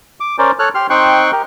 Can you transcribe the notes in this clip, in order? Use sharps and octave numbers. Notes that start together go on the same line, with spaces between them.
D6
C#4 A#4 C5 D5
A4 C#5 F6 F#6
G4 C6 F6
C4 D#4 G5 C6 C#6 F#6
G4 A#4